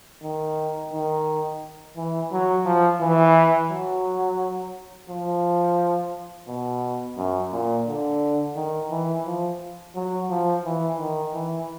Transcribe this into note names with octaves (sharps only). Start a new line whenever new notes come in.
D#3
D#3
E3
F#3
F3
E3
F#3
F3
B2
F#2
A#2
D3
D#3
E3
F3
F#3
F3
E3
D#3
E3